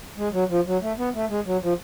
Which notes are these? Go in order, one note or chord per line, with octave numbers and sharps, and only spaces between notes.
G#3
F#3
F3
F#3
A3
B3
A3
G#3
F#3
F3